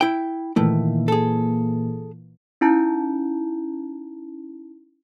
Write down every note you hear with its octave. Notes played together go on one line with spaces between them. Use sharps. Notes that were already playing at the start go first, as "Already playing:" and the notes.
E4 G5
A#2 D#3 E3 A3 A#3 E4
G#4 A4
C#4 D#4 E4 A5 A#5 G6